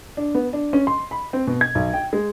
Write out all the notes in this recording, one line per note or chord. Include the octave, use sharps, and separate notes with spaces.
D4
B3
D4
C#4
C6
B5
C4
B2
G#6
B1
G5
G#3